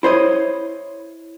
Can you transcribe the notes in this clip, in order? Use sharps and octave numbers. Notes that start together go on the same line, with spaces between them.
E4 C5 C#5 D#5